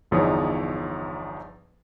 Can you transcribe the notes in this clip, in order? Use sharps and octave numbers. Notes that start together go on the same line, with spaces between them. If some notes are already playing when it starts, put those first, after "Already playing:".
G1 E2 F3 D#4 C#5 D#6